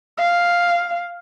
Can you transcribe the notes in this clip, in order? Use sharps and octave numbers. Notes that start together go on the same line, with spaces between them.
F5